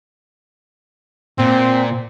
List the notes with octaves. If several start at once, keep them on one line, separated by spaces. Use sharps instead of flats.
A#2 C4